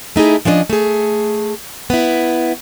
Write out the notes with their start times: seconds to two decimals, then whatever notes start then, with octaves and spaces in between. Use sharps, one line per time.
0.16 A3 D#4 E4 G#4
0.45 F3 C#4 D4 C#5 D#5
0.70 A3 G#4
1.90 B3 E4